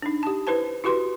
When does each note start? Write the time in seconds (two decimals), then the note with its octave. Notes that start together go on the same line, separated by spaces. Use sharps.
0.02 D4 D#4
0.23 G4 A5
0.47 E4 B4 C5 A5
0.84 E4 F#4 G4 B4 C6